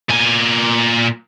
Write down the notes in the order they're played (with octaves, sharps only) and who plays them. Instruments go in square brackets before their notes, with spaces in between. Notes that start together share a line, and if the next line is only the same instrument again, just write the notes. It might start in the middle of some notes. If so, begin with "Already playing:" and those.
[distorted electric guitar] A#2 G#5